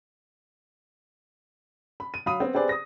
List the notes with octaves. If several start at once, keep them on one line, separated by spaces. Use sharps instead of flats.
B5
D#7
F#3 F5 B5 D#6 D#7
B3 C4
C4 G4 G#4 B4 C5 D5
D#6 A#6